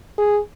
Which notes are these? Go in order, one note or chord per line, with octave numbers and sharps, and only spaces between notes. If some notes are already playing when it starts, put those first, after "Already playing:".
G#4